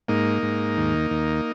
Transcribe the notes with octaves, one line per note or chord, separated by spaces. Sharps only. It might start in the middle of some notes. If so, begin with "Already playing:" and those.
G#2 A#3 D#4
G#2
D#2
D#2